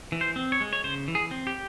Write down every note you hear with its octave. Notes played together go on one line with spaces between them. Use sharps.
E3
C5
C4
C#5
G#3
C#5
C#3 C5
E3
G#4
C4
G4